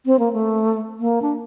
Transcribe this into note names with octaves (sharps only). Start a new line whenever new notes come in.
C4
A#3
A3
A#3
D4